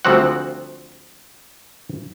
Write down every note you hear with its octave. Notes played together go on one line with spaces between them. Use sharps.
D2 F3 G3 C4 F#4 F#5